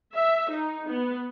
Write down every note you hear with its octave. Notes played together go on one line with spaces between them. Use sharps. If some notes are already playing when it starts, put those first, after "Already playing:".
E5
D#4
B3